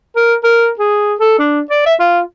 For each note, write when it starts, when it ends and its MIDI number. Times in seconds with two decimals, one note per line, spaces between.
0.16 0.35 70
0.44 0.70 70
0.79 1.14 68
1.20 1.36 69
1.39 1.60 62
1.71 1.84 74
1.86 1.94 76
2.00 2.20 65